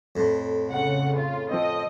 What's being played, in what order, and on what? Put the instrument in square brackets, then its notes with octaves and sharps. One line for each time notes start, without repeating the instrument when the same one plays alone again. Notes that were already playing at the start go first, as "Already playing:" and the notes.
[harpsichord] F2 A2
[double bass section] C#3 [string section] F#5
[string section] F4
[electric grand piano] F3 C4 [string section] D#5